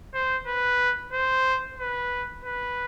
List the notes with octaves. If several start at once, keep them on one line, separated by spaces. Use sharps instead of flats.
C5
B4
C5
B4
B4